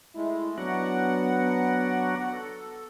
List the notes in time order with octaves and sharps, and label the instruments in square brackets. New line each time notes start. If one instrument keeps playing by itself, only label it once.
[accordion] G#3 A3 [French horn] E4
[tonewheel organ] F#3 D4 F#4 [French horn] B3 [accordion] F#5
[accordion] A4